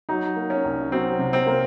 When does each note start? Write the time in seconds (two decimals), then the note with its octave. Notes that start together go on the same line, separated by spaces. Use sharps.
0.09 F#3 D#4
0.36 A#3
0.50 C#4
0.64 C2
0.92 F#3 C4
1.19 C3
1.33 C4
1.47 A#3